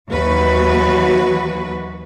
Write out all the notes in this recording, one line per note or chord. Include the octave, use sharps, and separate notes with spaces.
D#2 E3 F#3 F#4 B4